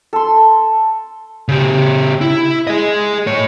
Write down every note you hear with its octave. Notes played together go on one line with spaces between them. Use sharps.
A4 C6
C#3 G4
E4
G#4 D#5
A2 C#5